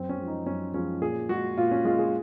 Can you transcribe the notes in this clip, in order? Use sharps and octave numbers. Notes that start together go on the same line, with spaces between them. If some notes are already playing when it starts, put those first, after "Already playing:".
Already playing: F#2 C4
C#4
F3 G#3
D#4
F#2 C#4
F3 G#3 C#4
A#2 G#4
G#3 F#4
A#2 F4
C#4
G#3 F4
G#4